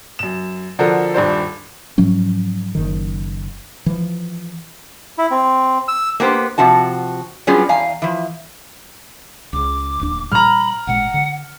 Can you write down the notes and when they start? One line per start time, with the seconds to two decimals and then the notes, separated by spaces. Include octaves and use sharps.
0.19 F#2 E7
0.79 D3 F3 D4 F#4 A4 A#4
1.14 D#1 G2 D4 C5
1.98 G#2 F3 F#3 C#4
2.75 F#1 D#3
3.86 E3 F3
5.18 E4
5.31 C4
5.88 E6
6.20 A#3 B3 G4 C5
6.58 C3 F3 F#4 A5
7.47 F#3 G3 B3 C#4 F4 G#4
7.69 E2 F5 G#5 A#5
8.02 E3 F3
9.53 C#2 C#3 D6
10.00 D1 D#2 D4
10.32 A#2 G3 A#5 B5 F6
10.87 A1 A#2 G#3 F#5
11.14 D3